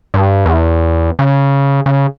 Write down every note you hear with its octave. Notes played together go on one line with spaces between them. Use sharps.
G2
E2
C#3
C#3